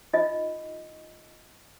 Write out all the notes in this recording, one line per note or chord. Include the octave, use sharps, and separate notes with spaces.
D#4 F4 D#5